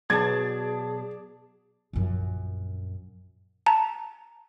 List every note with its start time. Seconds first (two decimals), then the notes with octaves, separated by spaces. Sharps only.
0.10 B2 F#3 G#4 D5 A5 G#6
1.93 A#1 F#2
3.66 A5 A#5